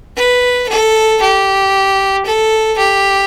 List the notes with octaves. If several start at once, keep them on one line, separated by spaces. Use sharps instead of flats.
B4
A4
G4
A4
G4